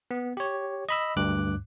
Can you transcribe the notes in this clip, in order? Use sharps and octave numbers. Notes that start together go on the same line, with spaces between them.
B3
G4 C#5
D#5 B5 E6
D2 G2 D6 F#6